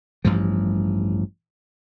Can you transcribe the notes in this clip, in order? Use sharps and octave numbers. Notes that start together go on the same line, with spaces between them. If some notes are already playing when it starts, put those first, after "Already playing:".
A1 G2 F3